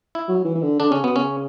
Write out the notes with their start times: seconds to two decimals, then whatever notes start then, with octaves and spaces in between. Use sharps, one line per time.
0.15 E4
0.28 F#3
0.45 E3
0.55 E3
0.63 D3
0.80 D3 D4
0.91 C#3 C#4
1.04 B2 B3
1.16 C#3 C#4